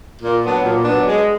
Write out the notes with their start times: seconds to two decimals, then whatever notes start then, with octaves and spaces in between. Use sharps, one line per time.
0.22 A#2
0.43 F#3 B3 D4
0.65 A#2
0.85 F#3 B3 D4
1.07 G#3